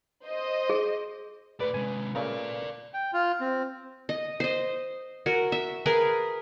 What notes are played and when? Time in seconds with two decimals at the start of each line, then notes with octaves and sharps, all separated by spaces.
0.24 C5 D#5
0.69 G#4
1.60 A2 B4 D5
1.74 C3 G#3 G#5
2.15 A#2 C#3 A3 A#4 D5
2.94 G5
3.13 F4
3.40 C4
4.09 D#5
4.40 C5 D#5
5.26 F#4 A#4
5.52 E5
5.86 G#4 A#4 B4